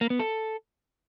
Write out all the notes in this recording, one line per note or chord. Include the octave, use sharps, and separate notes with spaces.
A#3
B3
A4